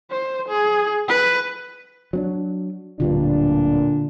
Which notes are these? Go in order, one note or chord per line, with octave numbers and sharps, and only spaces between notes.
C5
G#4
B4
F#3 C4 D4
D1 G2 A#2 D3 D4 F4